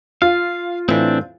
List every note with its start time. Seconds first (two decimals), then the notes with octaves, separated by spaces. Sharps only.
0.22 F4 F5
0.89 A2 E3 C4 D4